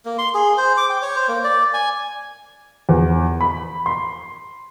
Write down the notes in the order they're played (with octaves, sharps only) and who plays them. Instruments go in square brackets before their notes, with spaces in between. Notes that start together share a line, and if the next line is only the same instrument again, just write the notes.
[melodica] A#3
C6
G#4
C5
D6
G5
C#5
C5
A#3
D5
G#5
[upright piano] E2
B5
C6